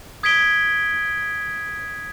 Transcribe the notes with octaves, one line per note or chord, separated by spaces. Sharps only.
D#6 G#6 B6 D7 G7